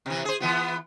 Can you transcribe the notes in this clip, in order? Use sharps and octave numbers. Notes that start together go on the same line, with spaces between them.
C3 E3
G#4 C5
E3 B3 F4